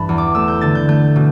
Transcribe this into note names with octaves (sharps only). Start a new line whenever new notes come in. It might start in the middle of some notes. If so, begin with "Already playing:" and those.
Already playing: G2 E3 G3 A5 B5
E2
D6
A3 E6
G6
D3 A6
G6
A3 G6
B2